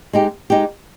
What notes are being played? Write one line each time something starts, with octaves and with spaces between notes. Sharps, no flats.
G#3 D#4 G4
G#3 D#4 G4